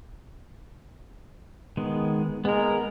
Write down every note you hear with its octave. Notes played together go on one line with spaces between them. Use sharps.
D#3 G#3 B3
G#3 B3 A#4